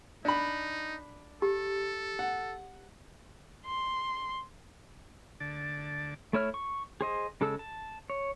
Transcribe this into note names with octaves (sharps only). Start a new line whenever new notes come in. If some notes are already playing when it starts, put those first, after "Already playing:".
D4 D#4 B5
G4 A4
F#5
C6
D2 D3 D5 A5
A3 E4 C#5 F6
C#6
G#4 C5 D#5
C#3 G#3 A4 A5 E6
A5
C#5